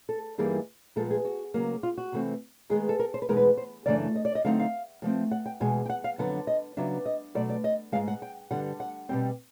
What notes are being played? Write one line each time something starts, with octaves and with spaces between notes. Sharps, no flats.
A4
G2 E3 G3 A#3 D#4 G#4
A#2 F3 G#3 B3 A4
G#4
F#4
C#3 F#3 A#3
F4
F#4
C3 E3 A3 C4
D#3 G#3 B3 G#4
A4
A#4
C5
B4
E2 B2 G#3 B3 D#4 A#4
B4
C5
F#2 C#3 E3 A3 D4 D5
D#5
D5
D#5
D3 F#3 A3 C4 D#4 F5
F5
A2 F3 A3 C4
F#5
G5
E2 B2 G#3 G#5
G5
F#5
F5
F2 D3 F#3 B3 D4 F#5
D#5
C#3 F#3 B3 D4 E5
D#5
B2 F#3 A3 D5
D5
D#5
G#2 F3 G#3 F5
F#5
G5
G2 D3 G3 F#5
F#5
B2 G3 C4 G5